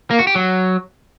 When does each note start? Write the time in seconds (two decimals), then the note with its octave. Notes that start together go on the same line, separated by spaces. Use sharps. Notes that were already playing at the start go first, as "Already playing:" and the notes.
0.11 A#3
0.19 F#4
0.27 G4
0.35 F#3